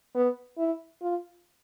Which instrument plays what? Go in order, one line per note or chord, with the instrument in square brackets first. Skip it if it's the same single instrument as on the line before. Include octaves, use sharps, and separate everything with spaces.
[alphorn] B3
E4
F4